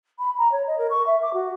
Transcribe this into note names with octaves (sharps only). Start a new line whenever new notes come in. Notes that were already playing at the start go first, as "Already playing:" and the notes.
B5
A#5
C#5
D#5
A#4
C#6
E5
D6
F#4